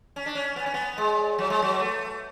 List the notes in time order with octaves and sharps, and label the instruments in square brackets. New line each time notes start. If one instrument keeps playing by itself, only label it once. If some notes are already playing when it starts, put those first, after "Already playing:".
[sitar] C#4 [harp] A5
[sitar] D4
C#4
[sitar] B3 [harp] G#5
[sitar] C#4
B3
G#3
[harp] D5
C#5
[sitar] F#3 [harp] C#5
[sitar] G#3
[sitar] F#3 [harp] B4
[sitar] A3 [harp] A4